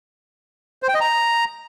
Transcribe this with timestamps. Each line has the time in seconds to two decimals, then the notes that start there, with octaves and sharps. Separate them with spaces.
0.83 C5
0.89 G5
0.95 D#5
1.01 A#5